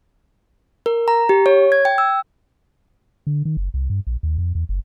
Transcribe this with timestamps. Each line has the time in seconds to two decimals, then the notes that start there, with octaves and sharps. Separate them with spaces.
0.86 A#4
1.08 A#5
1.29 G4
1.46 C#5
1.72 G#6
1.85 G5
1.98 E6
3.27 D3
3.45 D#3
3.57 F#1
3.74 C2
3.90 G2
4.07 A#1
4.23 D#2
4.38 F2
4.55 E2
4.69 F#1